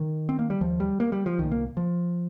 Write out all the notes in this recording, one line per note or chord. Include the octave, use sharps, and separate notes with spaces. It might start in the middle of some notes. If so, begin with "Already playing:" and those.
Already playing: D#3
C4
A#3
G3
D#2 F3
G3
A#3
G3
F3
C2 A#2 D#3
A#3
F3